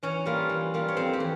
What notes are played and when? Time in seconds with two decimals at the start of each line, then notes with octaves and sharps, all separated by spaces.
0.03 E3 C#4 C#5
0.26 G3 A#3 F4
0.49 E3
0.74 G3 A#3 F4
0.88 C#5
0.97 F2 C4 C5
1.13 G4
1.20 E3